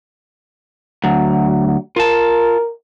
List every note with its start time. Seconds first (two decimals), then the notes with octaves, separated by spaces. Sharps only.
1.04 D2 F#3
1.96 F4 A#4 A5